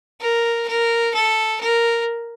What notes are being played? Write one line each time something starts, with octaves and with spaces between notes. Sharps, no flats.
A#4
A#4
A4
A#4